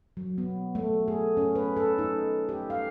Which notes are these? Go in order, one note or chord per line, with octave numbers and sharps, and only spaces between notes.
F#3
B3
A3
G#4
C#4
B4
A4
D#4
G4
F5